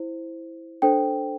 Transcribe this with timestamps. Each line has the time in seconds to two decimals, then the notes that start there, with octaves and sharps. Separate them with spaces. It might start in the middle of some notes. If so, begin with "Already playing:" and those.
Already playing: E4 C5
0.82 D4 A4 C5 G5